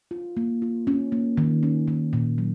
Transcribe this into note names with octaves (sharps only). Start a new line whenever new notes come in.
F4
A#3
F4
C#4
A#3
D#3
C#4
D#3
A#2
F#3